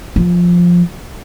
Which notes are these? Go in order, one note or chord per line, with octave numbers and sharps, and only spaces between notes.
F3